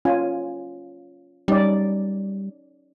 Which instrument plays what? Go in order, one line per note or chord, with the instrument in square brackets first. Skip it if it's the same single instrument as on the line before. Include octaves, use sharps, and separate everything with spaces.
[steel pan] C#4 F4 G#5
[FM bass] G3 [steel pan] C#4 D#4 D5